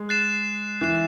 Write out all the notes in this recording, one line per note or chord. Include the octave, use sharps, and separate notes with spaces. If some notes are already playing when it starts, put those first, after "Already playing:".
Already playing: G#3
F#6 A6 C7 E7
E3 F#6 C7 E7